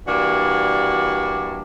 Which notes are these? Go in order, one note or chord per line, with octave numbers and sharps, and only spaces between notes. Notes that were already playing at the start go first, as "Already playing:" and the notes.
E3 G3 A#3 D4 F#4